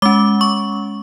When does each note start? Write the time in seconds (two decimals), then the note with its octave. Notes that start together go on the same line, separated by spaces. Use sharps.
0.02 G#3 C#4 D6
0.41 C#6